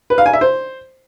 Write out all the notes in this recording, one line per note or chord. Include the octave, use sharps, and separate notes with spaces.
B4
F5
G#5
E5
C5